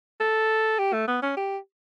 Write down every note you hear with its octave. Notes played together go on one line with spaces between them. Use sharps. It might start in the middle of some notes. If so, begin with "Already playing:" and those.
A4
G4
A3
B3
C#4
G4